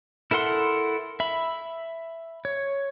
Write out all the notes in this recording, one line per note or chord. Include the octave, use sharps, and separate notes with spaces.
E4 A4 A#4 F#5 C6
E5 B5
C#5